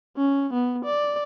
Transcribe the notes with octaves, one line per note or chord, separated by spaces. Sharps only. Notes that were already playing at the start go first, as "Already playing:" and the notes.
C#4
B3
D5